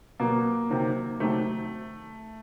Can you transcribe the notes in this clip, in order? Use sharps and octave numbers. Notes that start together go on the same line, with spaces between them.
B2 F#3 A#3
C3 D#3 F#3
C3 D#3 F#3 A3